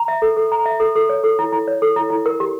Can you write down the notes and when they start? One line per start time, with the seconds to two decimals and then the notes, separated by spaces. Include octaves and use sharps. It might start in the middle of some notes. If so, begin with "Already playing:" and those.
Already playing: A#5
0.08 E5
0.22 A4
0.37 A4
0.52 A#5
0.66 E5
0.80 A4
0.96 A4
1.09 C#5
1.24 A4
1.39 E4
1.52 E4
1.68 C#5
1.82 A4
1.96 E4
2.10 E4
2.26 A#4
2.40 G4